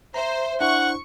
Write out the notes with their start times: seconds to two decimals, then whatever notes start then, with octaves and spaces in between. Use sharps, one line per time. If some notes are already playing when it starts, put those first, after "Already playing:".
0.14 C5 E5 A#5
0.61 D4 E4 C5 F#5 C#6